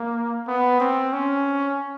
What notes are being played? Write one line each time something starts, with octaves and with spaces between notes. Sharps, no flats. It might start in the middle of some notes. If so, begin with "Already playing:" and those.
Already playing: A#3
B3
C4
C#4